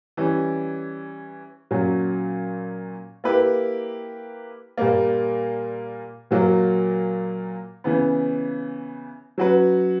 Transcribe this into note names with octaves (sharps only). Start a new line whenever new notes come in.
E3 G3 C#4
A#2 F#3 C#4
A#3 E4 G4 B4
A#2 G3 A#3
A#2 F#3 A#3
C#3 E3 B3
F#3 C#4 F#4 B4